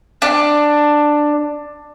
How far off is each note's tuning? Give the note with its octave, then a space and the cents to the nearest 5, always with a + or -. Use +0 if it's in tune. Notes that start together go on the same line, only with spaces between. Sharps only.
D4 +10